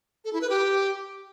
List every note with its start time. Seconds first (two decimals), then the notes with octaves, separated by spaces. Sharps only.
0.25 A4
0.33 E4
0.41 B4
0.50 G4